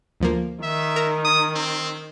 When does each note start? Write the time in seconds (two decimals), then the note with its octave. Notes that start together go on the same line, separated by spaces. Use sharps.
0.20 D2 F3 A#3
0.63 D#3 E5
0.96 A#4 A#5
1.25 D#6
1.55 C4